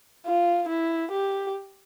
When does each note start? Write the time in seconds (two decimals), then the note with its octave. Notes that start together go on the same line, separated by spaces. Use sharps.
0.26 F4
0.69 E4
1.11 G4